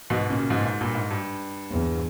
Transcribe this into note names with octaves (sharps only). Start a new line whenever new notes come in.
G#2 B2
A#2 C#3
G#2 B2
A#2
G#2
G2 A#2
G#2
G2
E2